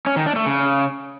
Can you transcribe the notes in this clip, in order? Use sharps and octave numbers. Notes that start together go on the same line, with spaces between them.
C#4
D#3
D4
A3
C#3